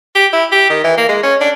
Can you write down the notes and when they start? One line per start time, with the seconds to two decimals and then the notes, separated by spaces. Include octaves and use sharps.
0.15 G4
0.33 E4
0.52 G4
0.70 D#3
0.84 E3
0.97 A#3
1.09 G#3
1.23 C#4
1.41 D4